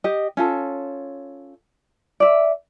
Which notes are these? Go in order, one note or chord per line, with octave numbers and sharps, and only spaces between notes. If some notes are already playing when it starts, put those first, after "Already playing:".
G4 D#5
C#4 F4 A4
D5 E5